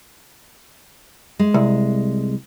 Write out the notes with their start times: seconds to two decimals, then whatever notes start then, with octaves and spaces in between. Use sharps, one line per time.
1.39 G#3
1.54 C2